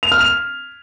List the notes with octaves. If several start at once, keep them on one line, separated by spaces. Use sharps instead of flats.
F7
F6
F7